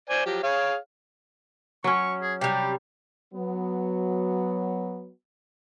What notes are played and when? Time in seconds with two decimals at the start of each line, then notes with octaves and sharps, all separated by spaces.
0.10 C5 D5 G#5
0.26 F3 F#3 G4
0.43 G#4 C#5 F5
1.84 F#3 C#4 C#6
2.22 G#4
2.41 C3 G3 G4
3.34 F#3 B3